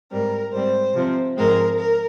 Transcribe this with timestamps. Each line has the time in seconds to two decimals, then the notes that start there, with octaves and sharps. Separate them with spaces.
0.11 G#2 G3 C4 A#4
0.52 G#2 G3 C4 C5
0.94 C3 F3 C4
1.36 G#2 F3 G#3 C4 A#4
1.78 A#4